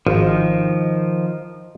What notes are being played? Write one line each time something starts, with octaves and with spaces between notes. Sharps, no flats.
G#1 D#3 F3